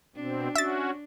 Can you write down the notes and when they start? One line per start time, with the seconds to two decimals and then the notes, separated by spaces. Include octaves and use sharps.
0.16 B2 C4 D4
0.56 C#4 F#4 E5 A6